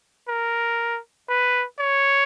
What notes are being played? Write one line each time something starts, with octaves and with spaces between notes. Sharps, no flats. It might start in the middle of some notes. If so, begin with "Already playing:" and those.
A#4
B4
C#5